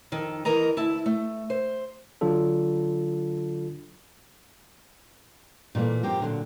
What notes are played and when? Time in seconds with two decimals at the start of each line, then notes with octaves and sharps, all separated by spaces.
0.12 F2 D#3 A4
0.45 D#3 E3 A#4 D#5 A#5
0.77 D2 E4 A5
1.06 A3
1.50 C5
2.21 D3 F#3 D4 F4 A4
5.75 A#2 E3 G3 A3 A#3
6.03 F#2 F3 C4 G4 A#4
6.20 A#2 D3 F#3